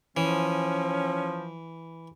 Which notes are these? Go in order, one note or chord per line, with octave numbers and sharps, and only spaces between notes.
E3 F3 C#4